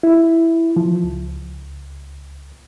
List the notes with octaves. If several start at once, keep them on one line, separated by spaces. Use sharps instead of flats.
E4
F3
C#2